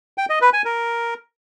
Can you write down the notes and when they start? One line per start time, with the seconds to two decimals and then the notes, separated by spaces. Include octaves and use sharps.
0.18 G5
0.30 D#5
0.41 B4
0.53 G#5
0.65 A#4